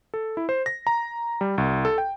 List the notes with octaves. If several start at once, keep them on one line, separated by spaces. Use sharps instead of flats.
A4
E4
C5
A#6
A#5
G3
C2
A4
G5